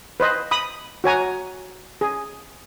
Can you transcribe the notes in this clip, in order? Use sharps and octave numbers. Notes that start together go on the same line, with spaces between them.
B4 C5 D#5
B5 D#6
F#4 C#5 G#5 A#5
G#4